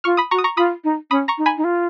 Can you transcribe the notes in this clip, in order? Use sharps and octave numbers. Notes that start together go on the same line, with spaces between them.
F4 C#6 F6
B5 D#6
F#4 A#5 C#6
D#6
A#5 C#6
F4 B5 D#6
D#4
C#4 B5 D#6
A#5 C#6
D#4
G#5 B5
D#4
F4